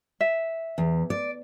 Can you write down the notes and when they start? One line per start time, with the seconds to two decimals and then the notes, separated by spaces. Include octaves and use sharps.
0.21 E5
0.78 E2
1.10 D5